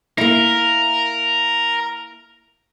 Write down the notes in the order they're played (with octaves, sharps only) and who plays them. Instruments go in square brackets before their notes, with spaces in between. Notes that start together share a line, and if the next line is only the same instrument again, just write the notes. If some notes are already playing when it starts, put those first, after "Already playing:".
[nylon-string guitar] A#3 E4 [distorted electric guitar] A#4